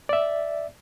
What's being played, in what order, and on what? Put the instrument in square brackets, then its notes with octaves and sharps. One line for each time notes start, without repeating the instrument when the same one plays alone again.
[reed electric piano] D5 E5